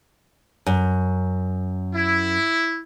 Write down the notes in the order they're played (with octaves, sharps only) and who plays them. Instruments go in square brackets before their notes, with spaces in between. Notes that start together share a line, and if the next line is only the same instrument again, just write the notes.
[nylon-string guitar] F#2
[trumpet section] E4